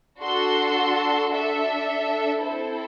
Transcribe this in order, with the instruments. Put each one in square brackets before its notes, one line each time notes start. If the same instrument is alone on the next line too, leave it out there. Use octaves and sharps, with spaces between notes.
[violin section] D4 F#4 A4 C6
D4 A4 E5
C4 E4 A4 C5